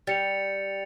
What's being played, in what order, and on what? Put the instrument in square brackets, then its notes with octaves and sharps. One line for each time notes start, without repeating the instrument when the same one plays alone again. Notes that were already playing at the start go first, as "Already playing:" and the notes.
[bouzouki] G3 [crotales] A6 C#7 F7